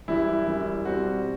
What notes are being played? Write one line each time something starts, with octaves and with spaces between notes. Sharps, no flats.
F#2 E3 G3 E4
F#2 E3 G3
B2 G3 C4 F#4